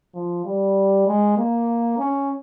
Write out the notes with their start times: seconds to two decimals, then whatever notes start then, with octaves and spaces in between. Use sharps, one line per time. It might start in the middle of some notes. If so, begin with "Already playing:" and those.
0.15 F3
0.45 G3
1.08 G#3
1.38 A#3
1.99 C#4